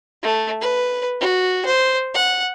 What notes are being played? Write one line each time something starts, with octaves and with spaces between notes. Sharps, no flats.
A3
B4
F#4
C5
F#5